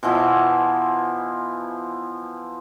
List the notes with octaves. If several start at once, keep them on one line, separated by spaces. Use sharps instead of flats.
B2 E3 F3 E4